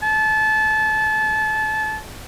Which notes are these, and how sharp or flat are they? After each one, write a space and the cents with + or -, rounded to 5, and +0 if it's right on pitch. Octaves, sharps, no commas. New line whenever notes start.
A5 -25